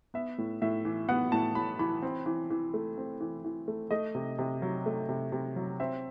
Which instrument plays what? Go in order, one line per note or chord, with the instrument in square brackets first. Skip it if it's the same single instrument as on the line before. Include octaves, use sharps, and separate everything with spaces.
[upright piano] B3 E5
A2
A2 E5
E3
B3 F#5
A2 A5
A2 B5
E3 B5
C4
E3
E3
A3
C4
E3
E3
A3
A3 D#5
C3
C3
F#3
A3
C3
C3
F#3
C4 E5